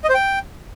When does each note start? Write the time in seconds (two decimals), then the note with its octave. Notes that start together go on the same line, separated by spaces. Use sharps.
0.04 D#5
0.09 C5
0.14 G5